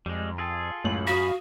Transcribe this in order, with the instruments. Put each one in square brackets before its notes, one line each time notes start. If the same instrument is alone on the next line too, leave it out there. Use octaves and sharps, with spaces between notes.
[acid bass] F2 [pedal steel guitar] G3 G#3
[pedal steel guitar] F4 G#4 A4
[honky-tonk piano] C#2 A2 F#7 [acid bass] F#2
[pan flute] F#4 [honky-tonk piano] F5 D#6 [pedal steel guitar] B5